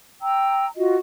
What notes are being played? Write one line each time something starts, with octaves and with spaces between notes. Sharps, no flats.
G5 A#5 E6
F4 F#4 D#5